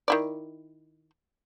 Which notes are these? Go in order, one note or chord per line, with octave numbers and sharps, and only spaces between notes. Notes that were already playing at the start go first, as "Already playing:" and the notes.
D#3 E4 D5